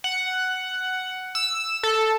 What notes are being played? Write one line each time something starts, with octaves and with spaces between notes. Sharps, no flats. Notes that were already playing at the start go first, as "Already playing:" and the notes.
F#5
E6
A4